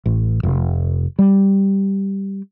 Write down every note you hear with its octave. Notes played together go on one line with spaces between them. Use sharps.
A1
F1
G3